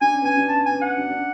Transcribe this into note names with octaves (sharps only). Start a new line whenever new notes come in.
D4 G#5
C#4
B3
C#4 G#5
D4
C#4 A5
B3 G#5
C#4
F#5
D4
D4